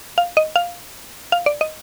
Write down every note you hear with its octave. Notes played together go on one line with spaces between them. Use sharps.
F5
D#5
F5
F5
D5
D#5